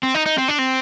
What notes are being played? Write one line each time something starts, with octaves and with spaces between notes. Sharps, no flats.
C4
D#4
D#4
C4
D4
C4